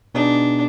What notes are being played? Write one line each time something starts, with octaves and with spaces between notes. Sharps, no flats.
B2 B3 D4 D#4 G#4